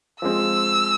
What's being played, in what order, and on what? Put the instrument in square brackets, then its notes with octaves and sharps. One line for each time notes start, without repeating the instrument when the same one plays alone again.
[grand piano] F3 G#3 C4 [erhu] E6